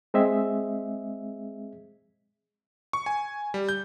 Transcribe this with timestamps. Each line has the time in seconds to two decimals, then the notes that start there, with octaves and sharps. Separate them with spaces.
0.14 G#3 C4 G#4 D#5 E5
2.93 C#6
3.06 G#5
3.54 G3
3.69 G6